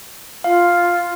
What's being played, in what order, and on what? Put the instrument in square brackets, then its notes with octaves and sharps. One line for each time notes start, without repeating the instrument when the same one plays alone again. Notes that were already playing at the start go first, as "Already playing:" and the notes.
[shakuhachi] F4 [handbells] F5